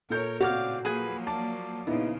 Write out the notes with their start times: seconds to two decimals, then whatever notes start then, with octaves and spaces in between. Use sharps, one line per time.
0.10 A#2 A4 A#4 C#5 G6
0.41 A2 C#3 C4 F#4 C#5 D5 F5
0.85 F3 F#3 A#3 G#4 B4 G#5
1.27 D5 A5
1.87 A#2 C#3 F3 B3 D#4 E4